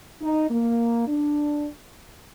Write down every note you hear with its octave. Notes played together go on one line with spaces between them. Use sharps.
D#4
A#3
D4